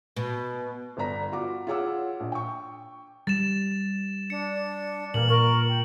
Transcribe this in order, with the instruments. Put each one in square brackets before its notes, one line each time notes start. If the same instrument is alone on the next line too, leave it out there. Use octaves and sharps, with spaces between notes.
[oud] B2
[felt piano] G1 B3 D4 A#5 B6
F4 F#4 D6
F4 G#4 C#5 F#5 D6 E6
A#1
G5 C#6
[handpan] G3 [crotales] A6 E7
[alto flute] D4 [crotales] C#7
[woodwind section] G2 E3 A#3 [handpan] A#2 [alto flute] A#4 [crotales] F#7
[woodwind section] A#4 [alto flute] C#6
[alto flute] G5